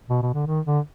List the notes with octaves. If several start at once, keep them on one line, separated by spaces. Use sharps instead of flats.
B2
B2
D3
D#3
D3